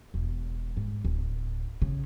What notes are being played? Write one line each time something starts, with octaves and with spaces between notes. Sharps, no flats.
E1
G#2
D1
C#3